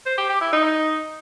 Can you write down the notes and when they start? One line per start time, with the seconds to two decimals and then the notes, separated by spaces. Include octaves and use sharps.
0.06 C5
0.18 G4
0.29 G4
0.41 E4
0.53 D#4